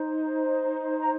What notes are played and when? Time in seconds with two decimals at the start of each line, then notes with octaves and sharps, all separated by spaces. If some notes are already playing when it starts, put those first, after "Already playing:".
Already playing: D#4 C5
1.01 A#5